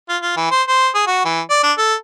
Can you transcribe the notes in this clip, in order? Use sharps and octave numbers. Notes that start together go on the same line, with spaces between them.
F4
F4
E3
C5
C5
G#4
F#4
E3
D5
D4
A4